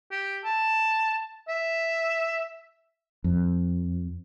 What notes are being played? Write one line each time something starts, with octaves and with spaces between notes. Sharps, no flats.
G4
A5
E5
F2